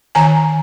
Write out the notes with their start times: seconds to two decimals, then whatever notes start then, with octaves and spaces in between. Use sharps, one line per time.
0.15 D#3 G#5 A#5